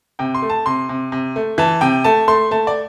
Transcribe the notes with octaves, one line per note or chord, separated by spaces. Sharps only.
C3 G5
C6
A3
A5
C3 C6
C3
C3
A3
E3 A5
C3 G5
A3 A5
A3 C6
A3 A5
D5